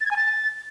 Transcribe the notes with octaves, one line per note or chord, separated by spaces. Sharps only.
A6
G#6
G#5
A6